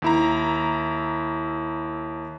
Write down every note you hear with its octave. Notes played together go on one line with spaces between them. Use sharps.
D#2 E4 A#5